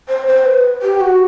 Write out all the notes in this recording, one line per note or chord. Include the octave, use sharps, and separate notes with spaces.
C5
C5
B4
G4
F#4